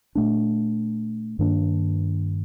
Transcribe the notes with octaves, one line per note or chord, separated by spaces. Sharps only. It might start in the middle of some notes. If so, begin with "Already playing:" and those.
A#2 A3 D4
G2 D#3 A#3 D4